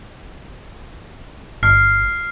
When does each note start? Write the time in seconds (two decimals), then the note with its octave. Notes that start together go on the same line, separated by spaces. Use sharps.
1.63 G1 F6 C7